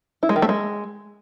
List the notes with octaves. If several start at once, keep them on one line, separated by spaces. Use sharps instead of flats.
E4
G#3
D#3
A3
G#3